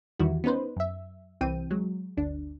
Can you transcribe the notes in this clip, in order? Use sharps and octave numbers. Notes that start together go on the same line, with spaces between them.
E2 D#3 E3 G3 E4 F#4
B3 C#4 D#4 B4 C5
F#2 E5
C2 E3 C4 G5 D#7
F#3 G#3
G1 D2 D4